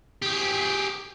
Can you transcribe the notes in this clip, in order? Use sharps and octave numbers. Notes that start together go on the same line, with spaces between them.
G4 G#4